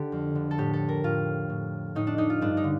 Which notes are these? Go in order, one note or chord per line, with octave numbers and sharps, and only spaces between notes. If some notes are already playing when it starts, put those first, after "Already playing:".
Already playing: D3 G4 A4
F2
D3
A4
A2 G4
A4
A#4
A2 F4
A2
A2 D#4
D4
D#4
F4
G2 D4
D#4
D3